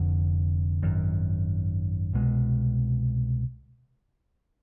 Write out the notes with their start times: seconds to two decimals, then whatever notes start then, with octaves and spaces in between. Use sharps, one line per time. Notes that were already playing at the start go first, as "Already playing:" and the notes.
Already playing: F1 F2 D3
0.82 G#1 F#2 D#3
2.13 C2 B2 G#3